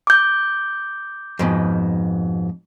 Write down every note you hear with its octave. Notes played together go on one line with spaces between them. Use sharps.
D6 G6
F2 G#2 B2